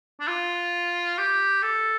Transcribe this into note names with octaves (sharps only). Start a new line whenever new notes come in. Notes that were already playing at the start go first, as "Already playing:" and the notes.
D4
F4
G4
A4